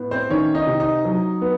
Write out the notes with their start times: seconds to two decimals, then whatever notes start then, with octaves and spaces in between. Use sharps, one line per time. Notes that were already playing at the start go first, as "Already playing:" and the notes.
Already playing: A2 B3
0.11 C4 C5
0.30 D#3 C#4 C#5
0.55 D#4 D#5
0.67 C3
0.80 D#4 D#5
1.05 F#3
1.42 B3